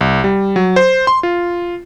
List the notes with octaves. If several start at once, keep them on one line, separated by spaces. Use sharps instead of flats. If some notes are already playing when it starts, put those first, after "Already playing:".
C2
G3
F#3
C5
C6
F4